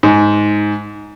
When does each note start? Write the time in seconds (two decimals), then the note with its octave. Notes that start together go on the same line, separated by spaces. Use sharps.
0.03 G#2